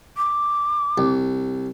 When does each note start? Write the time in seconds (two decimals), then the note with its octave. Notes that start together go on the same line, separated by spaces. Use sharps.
0.17 D6
0.98 C2